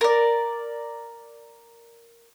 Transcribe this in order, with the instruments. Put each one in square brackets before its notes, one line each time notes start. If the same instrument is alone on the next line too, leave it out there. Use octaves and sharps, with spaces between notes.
[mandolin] A#4 D5